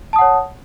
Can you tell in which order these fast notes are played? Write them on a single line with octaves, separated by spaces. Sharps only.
A5 D#6 F#5 C#5